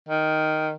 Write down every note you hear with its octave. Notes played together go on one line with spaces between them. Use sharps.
D#3